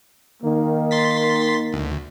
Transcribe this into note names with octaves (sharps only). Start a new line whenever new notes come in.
D#3 A#3
C6 A6 B6
D2